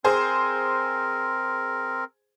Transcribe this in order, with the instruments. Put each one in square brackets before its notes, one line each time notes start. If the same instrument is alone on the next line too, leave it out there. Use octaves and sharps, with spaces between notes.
[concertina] C4 A#4 [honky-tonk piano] G#4 C5